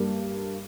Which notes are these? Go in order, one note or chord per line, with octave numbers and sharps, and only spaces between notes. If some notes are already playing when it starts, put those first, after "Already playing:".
Already playing: G2 G3 A#3